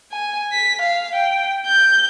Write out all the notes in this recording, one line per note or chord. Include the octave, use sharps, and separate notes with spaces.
G#5
B6
F5
G5
G6